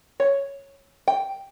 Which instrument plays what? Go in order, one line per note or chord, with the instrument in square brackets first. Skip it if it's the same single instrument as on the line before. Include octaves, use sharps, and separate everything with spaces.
[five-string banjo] C#5
G5